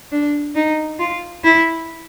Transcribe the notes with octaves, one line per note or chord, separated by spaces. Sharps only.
D4
D#4
F4
E4